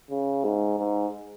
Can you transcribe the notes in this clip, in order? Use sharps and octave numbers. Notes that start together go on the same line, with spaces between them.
C#3
G#2
G#2